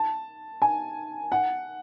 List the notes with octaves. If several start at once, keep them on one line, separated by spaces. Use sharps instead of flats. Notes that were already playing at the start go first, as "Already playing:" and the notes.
Already playing: A5
G#5
F#5